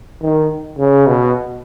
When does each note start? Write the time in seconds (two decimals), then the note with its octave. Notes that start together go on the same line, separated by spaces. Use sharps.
0.22 D#3
0.79 C#3
1.07 B2